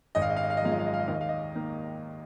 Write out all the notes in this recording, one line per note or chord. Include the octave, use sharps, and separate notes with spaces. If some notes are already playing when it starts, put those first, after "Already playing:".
G#1 D#5
F5
D#5
F5
D#5
F5
D#5
F#2 F3 G#3 F5
D#5
F5
D#5
F5
D#5
D#2 F5
D#5
F5
D#5
D#3 A#3